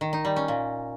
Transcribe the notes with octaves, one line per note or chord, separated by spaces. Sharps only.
D#3
D#4
G3
C#4
A#2